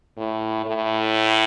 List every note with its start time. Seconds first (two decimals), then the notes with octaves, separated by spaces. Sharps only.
0.17 A2
0.66 A2